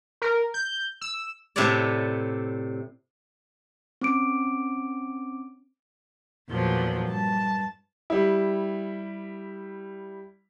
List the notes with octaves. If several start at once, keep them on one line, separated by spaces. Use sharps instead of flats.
A#4
G6
E6
A2 C3 A4 B4 C#5 D5
C4 C#4 D6 D7
E2 A#2 F3 F#3
G2 A5
G3 E4